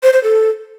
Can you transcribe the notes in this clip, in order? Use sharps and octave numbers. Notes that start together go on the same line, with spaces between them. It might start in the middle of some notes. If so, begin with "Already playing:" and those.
C5
C5
A4